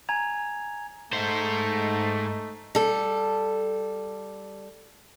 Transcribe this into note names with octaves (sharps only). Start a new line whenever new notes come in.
G#5 A#5 G#6 F7
G#2 A3 D#4 C5
G3 A4